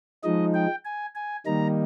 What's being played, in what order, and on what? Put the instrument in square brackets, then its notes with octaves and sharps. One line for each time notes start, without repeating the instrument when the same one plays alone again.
[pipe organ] F3 G#3 D#4 D#5
G5
G#5
G#5
D#3 G3 A#3 D#4 A#5